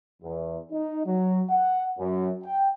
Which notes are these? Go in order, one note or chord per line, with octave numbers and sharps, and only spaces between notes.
E2
D#4
F#3
F#5
F#2
G5